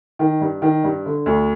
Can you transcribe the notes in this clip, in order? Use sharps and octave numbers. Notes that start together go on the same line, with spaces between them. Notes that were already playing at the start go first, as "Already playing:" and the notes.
D#3
G2
D#3
G2
D3
D2